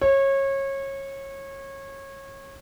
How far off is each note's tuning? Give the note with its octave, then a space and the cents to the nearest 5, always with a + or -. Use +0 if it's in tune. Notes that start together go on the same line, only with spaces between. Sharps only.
C#5 -25